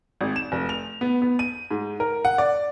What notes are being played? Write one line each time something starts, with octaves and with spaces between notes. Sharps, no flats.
G#1
E7
F1
F7
B3
B3
D#7
G#2
A#4
F#5
D5